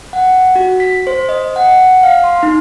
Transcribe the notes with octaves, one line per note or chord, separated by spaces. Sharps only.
F#5
F#4
B6
C5
D#5
F#5
F5
C6
D#4